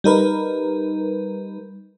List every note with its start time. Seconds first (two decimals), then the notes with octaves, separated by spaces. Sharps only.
0.04 G3 D#4 A#4 B4